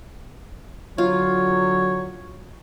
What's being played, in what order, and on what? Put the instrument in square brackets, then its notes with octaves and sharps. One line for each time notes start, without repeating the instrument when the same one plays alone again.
[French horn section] D3 F#3 [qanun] F4 [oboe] C#5